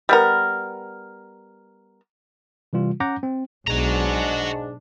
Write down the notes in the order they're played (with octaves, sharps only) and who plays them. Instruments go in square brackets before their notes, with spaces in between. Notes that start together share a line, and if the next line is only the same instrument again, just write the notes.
[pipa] G3 B3 A#4
[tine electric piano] C3 E3 G3 F4
C#4 F#5 A#5 D6 G6 A#6
C4
[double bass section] B1 [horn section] G#2 G#3 D4 [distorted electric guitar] F#4 A#5